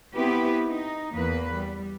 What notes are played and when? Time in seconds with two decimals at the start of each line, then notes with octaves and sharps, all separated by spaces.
0.16 B3 C4 E4 G4 B4
0.68 D#4
1.14 E2 A#3 B4
1.55 G3